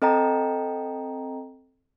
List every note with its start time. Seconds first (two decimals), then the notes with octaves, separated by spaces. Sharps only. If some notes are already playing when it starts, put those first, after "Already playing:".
0.02 C4 A4 D#5 G5 A#5